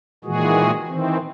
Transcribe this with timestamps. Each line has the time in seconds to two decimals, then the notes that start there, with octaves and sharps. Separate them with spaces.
0.24 A#2 D#3 E3 G#3 F#4 G#4
0.88 D#3 E3 C4